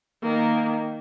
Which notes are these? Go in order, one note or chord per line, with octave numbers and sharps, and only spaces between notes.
D#3 A#3